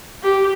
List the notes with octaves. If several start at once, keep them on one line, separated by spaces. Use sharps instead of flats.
G4